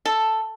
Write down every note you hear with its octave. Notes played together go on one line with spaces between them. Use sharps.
A4